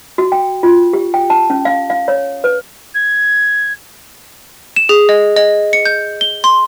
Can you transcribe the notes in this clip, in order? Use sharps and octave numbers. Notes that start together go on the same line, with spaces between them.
F#4
G5
F4
G4
G5
A5
C#4
F5
F5
C#5
B4
G#6
E7
G#4
D#5
D#5
C#7
G6
G7
C6